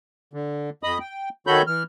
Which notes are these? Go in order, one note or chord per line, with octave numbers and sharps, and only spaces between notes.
D3
F2 D#5 B5 D#6
G5
D#3 F#4 A4 C#5 B5 G6
E3 F6